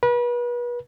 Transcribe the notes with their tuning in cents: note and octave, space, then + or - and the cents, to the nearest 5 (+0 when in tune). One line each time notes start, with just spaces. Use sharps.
B4 -35